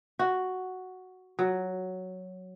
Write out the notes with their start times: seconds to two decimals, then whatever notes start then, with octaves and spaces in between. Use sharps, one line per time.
0.19 F#4
1.39 F#3